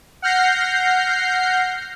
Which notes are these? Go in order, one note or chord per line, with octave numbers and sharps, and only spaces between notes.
F#5 F6 G6 A#6 C7